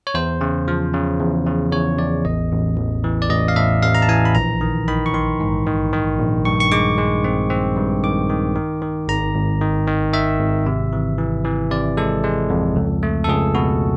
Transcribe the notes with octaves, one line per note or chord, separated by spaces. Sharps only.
C#5
E2 C5
C#3
F3
C#3
E2
C#3
E2 C#5
E2 D5
A1 D#5
A1
A1
E3
D5
A1 D#5
F5
A2 E5
A1 F5
A#5
A5
E3 G#5
B5
A#1 A#5
D#3
D#3 B5
C#6
D#3 C6
G#2
D#3
D#3
A#1
G2 C#6
C#6
G#3 D6
G#3
C4
C4
G2
D#3 D6
D#3
D#3
D#3
G#1 A#5
G#1
D#3
D#3
D#3 E5
G#1
C3
E3
E3
E3
C3 D5
G#3 A4
G#3
F2
C#2
A3
A4
C#2 G#4
B2 F#4